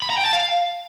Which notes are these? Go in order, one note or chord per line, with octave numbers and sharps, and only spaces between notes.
B5
A#5
G5
A5
F5